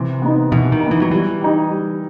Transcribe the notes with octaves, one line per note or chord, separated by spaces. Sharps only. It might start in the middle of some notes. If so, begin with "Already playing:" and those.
Already playing: C3 E3
B3 D#4
B2 E3
D#3
D#4
E3 B3
F#3
E3 G3
D#4 G4
G3